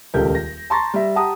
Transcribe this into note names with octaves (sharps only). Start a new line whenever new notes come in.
D#1 C#2 G4 A4 A#4 G6
A#6
A5 A#5 C6 C#6 A6 A#6
G3 E5
G4 F#5 A5 A#5 D#6